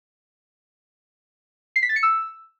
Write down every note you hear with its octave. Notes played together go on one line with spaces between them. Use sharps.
C7
B6
A6
C#7
E6